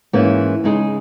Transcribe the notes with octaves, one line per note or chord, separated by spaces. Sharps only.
G#2 E3 A#3 C#4
C#3 G#3 D#4 G#4